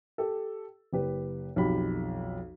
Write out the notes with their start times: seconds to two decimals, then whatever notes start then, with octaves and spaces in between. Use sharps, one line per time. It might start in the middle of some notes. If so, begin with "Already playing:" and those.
0.18 G4 A4
0.93 F#1 G4 B4
1.56 B1 F2 G4 B5